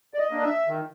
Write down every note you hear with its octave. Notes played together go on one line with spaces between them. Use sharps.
D5
D#5
A#3 D4
E5
D#3